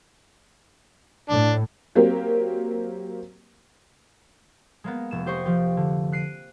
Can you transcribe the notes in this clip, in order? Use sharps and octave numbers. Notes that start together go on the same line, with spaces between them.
A2 D4
F#3 A#3 C4 G4 A#4
G#3 A#3 B3
F1 E7
G4 C5 D#5 C#6
F3 G4
D3
F#6 C7 D7 D#7